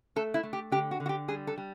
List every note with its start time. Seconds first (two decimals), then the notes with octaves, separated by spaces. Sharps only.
0.16 A3 A4
0.34 E4
0.43 A3
0.53 G4
0.72 D3 G4
0.91 F#4
1.00 D3
1.06 F#4
1.09 G4
1.28 G3 G#4
1.47 A4
1.58 G3